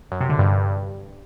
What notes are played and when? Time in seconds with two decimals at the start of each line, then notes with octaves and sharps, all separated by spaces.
0.12 F#2
0.21 C3
0.30 D3
0.38 G2